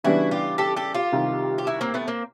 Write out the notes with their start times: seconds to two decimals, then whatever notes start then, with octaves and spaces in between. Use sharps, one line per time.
0.04 C#3 E3 G3 B3 D4 E4 F#4
0.31 F4 G4
0.58 G4 A4
0.76 G4 A4
0.94 F4 G4
1.12 C2 C3 D#3
1.58 G4
1.67 E4 F#4
1.81 A#3 C4
1.94 A3 B3
2.08 A#3 C4